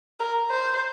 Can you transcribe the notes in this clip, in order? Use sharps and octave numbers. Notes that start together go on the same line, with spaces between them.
A#4
C5